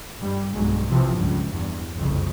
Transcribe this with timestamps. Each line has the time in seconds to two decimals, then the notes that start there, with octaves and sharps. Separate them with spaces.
0.20 G2 G3
0.53 B1 G2 F#3 G#3
0.89 C3 E3 F3
1.18 C#2 G2
1.53 E2 G2
1.95 F#1 C2 F2 C#3